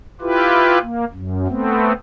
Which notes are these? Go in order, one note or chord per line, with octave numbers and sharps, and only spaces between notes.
E4 F4 G4 B4
A#3
F#2
A3 B3 C4